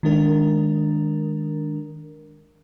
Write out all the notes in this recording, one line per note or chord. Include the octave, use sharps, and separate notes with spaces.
D#3 G#3 D4 A#4